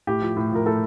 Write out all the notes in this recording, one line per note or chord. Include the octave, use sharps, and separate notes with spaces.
A2 G4
F3
A2
F3 A#4
A2 A4